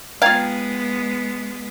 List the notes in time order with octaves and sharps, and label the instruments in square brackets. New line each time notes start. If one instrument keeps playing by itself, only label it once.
[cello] G#3 B3 [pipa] F4 F5 [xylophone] G5 A#5 G#6